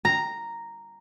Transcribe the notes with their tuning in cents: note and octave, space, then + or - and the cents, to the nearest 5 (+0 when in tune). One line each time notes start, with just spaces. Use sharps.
A#5 -5